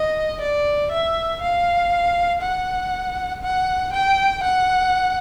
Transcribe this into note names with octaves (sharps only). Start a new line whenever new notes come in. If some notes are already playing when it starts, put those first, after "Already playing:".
Already playing: D#5
D5
E5
F5
F#5
F#5
G5
F#5